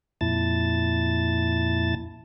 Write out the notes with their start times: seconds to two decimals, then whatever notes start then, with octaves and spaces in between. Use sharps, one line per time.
0.21 F2 A#2 E4 A5 A6